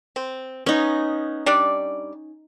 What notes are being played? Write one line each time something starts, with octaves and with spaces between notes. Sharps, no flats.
C4
B3 C#4 D#4
G3 D4 D5